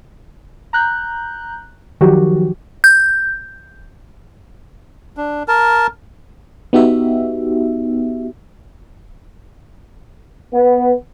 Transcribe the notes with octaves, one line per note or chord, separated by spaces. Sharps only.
A#5 F#6 G6
D#3 F3 F#3 F#4 G4
G6
D4
A#4 A5
B3 D#4 F#4 G4 E5
B3